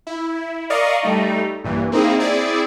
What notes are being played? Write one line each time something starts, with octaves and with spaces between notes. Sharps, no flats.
E4
A#4 D5 D#5 F5 C#6 D#6
G3 A3 D#4
A#1 G2 A#2 E3
A#3 C4 D#4 E4 G#4
C4 E4 G#4 D5